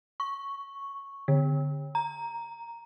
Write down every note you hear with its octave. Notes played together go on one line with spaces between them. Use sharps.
C#6
D3
A#5